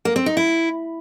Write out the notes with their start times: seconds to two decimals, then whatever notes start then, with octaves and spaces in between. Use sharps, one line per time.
0.05 A#3
0.16 C4
0.26 D#4
0.37 E4